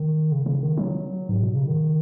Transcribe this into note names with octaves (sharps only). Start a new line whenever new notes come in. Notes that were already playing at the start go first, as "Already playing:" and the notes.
Already playing: D#3
C#3
C#3
D#3
F#3
G#2
B2
C#3
D#3